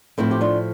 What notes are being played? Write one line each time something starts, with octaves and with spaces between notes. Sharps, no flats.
A2 F3 C4 E4
G4
D4 F4